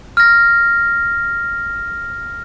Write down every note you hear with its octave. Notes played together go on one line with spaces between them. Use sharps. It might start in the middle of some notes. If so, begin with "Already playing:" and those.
F6 A#6